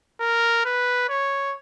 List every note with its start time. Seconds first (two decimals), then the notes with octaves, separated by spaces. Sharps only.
0.20 A#4
0.65 B4
1.09 C#5